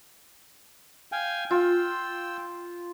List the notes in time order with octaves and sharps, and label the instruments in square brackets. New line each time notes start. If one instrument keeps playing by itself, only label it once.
[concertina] F5 G5 G#5
[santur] F4 [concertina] G5 E6